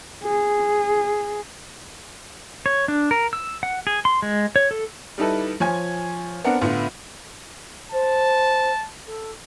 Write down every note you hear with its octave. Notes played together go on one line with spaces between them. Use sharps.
G#4
C#5
D4
A#4
E6
F#5
G#4
C6
G#3
C#5
A4
G3 D#4 E4 A4 B4
F3 C#5 G#5 G#6
B3 C4 D4 A#4 F#5
A2 D3 B3 F4
C5 A5
A4